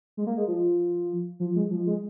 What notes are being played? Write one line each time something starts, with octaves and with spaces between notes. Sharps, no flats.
G#3
A#3
G#3
F3
F3
G#3
F3
G#3